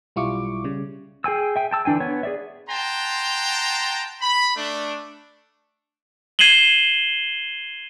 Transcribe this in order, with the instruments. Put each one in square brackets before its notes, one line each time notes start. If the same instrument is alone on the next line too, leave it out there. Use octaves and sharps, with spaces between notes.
[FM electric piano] B1 G3 E4 F4 C#6 D6
C#3 G3
[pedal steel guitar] G#4 G5 G#5 E6
E5 G5
G5 A5 E6
D3 E3 D4 G5 G#5
B3 C#5
G#4 D5 E5
[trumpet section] F#5 G5 A5 A#5 C6
B5
A3 D4
[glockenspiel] G#6 C7 D#7 E7 F#7 G7